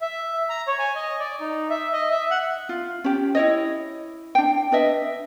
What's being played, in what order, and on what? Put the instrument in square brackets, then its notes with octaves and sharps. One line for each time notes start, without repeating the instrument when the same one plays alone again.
[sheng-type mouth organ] E5
A#5
C#5
G#5
D#5
D5
D#4
E5
D#5
E5
F#5
[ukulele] F4
C#4 G4
E4 C#5 D#5
D4 G5
D4 B4 D#5 E5